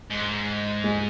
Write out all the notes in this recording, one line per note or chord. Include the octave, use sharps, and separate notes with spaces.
G#2
G#3